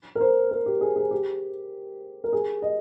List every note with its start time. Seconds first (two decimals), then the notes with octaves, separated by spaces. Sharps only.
0.15 A#4
0.21 C5
0.51 A#4
0.66 G4
0.81 G#4
0.96 G#4
1.11 G4
2.24 A#4
2.33 G#4
2.62 D#5